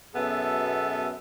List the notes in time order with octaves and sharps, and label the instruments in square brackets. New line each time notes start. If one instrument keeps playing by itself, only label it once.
[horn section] F#2 B2 B3 G#4 A4 E5